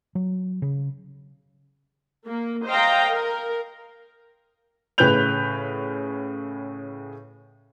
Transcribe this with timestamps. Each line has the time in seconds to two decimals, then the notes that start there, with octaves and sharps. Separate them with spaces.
0.15 F#3
0.62 C#3
2.27 A#3
2.67 C5 D#5 F5 G5 A#5
3.08 A#4
4.98 A2 C#3 B4 F#6 G6 F7